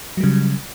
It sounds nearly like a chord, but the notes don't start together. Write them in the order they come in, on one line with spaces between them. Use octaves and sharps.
F#3 G3 C#3